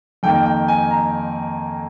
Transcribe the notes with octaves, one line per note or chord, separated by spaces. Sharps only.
F2 D#3 A#3 G5
G5
G#5
A#5